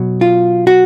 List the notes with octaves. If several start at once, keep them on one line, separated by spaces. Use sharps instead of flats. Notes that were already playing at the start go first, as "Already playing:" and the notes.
Already playing: B2 F#3
F4
F#4